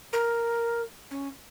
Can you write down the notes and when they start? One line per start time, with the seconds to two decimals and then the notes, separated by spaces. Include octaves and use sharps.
0.13 A#4
1.11 C#4